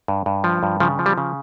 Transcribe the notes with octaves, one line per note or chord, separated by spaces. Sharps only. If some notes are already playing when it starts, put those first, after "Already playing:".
G2
G2
F3
G2
C#3 F3
F3
G3
C#3